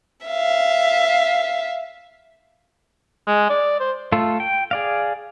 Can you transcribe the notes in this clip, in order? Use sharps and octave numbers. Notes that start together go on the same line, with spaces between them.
E5 F5
G#3
D5
C5
A3 F4 A4
G5
G#4 D5 F5